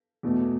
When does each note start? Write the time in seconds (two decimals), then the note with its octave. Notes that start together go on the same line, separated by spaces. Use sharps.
0.23 E2 B2 A3